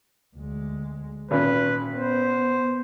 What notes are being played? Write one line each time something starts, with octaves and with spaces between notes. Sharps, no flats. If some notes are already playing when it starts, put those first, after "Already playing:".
D2 G#3
G#1 A#2 C#4 B4
B3 C5